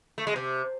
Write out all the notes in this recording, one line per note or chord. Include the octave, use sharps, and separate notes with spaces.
A3
G#3
C3